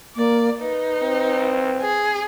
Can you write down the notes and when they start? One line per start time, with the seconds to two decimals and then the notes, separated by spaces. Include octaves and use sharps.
0.16 A#3 D5
0.60 D#4 B4
1.02 C4
1.81 G#4